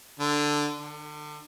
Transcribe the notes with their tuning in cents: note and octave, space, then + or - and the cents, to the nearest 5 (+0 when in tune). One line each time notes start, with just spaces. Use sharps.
D3 +5
D3 +35